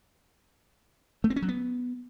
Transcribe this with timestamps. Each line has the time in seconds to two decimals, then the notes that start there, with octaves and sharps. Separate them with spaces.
1.24 A3
1.30 C4
1.36 C#4
1.42 F#3
1.49 B3